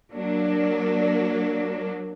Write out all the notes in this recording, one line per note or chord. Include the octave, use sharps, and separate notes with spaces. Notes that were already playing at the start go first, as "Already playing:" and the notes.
F#3 A#3 D4